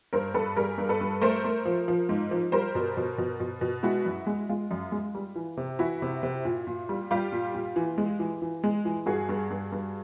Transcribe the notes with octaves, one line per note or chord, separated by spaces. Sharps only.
G2 A#4 C5
G2 A4 B4
G3 G#4 A#4
G2
A4 B4
G2
A3 A#4 C5
A3
F3
F3
G#2
F3
G3 A#4 C5
B2
B2
B2
B2
B2
G#3 E4 F#4
F#2
G#3
G#3 F4
F#2
G#3
G3
E3
C3
E3 E4 F#4
C3
C3
A#2
A#2
G3
G3 F4 G4
A#2
A#2
E3
G#3
E3
E3
G#3
E3
G2 F#4 G#4
G2
G2
G2